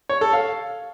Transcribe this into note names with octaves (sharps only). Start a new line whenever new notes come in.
C#5
A4
F5